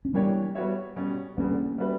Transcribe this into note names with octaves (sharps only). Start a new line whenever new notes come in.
C#4
E3 G3 A#3 B3 D4 G4 C#5
G3 B3 F#4 C#5 E5
B2 G3 C#4
E2 D3 G3 A#3 B3 C#4
G3 B3 F#4 B4 E5